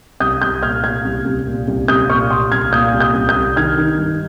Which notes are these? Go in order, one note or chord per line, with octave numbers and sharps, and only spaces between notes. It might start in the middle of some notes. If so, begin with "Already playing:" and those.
C2 D#6 G6
C2 D#6 G6
A#2 F6 G#6
A#2 F6 G#6
C2
C2
A#2
C2
C2 D#6 G6
A#2 C#6 F6
A#2 C6 D#6
C2 F6 G#6
A#2 D#6 G6
C2
D#6 G6
C2
D#6 G6
C2
D#3 F6 G#6
D#3
G2